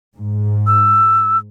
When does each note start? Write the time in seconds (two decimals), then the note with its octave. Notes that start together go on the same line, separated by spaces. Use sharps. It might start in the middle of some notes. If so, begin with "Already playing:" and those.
0.15 G#2
0.67 E6